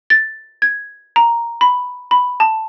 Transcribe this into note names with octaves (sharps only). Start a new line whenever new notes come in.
A6
G#6
A#5
B5
B5
A5